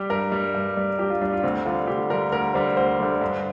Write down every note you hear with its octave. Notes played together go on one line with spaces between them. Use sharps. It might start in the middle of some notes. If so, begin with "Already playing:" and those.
Already playing: G3 G4
G2 A#4
G3
G2
G3
G2 G4
F4
G3 D4
F4
D2 C4
D3 G3 F4
D2 G4
D3 G3 A#4
D2 A#4
D3 G3 C5
D2 C5
D3 G3
G2